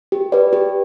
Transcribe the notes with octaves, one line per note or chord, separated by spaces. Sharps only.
G4
B4 D5
G4